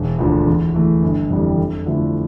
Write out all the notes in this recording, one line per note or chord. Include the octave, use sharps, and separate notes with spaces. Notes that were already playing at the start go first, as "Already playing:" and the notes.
Already playing: E1
D2 D3 F3
E2
E3 A3
G1
F2 E3 G3
F2
D3 F3 A3 E4